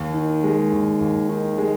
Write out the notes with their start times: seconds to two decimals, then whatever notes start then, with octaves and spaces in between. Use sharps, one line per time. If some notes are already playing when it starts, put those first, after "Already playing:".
Already playing: D#2
0.14 D#3
0.43 G#3
0.72 D#2
1.01 D#2
1.29 D#3
1.58 G#3